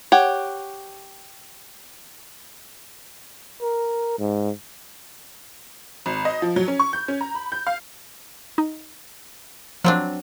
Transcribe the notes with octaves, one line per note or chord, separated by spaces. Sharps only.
G4 C#5 F#5
A#4
G#2
G#1
D#5
F3
F#3
C#4
C#6
G6
C#4
A#5
B5
G6
F5
D#4
F3 F#3 C4 D4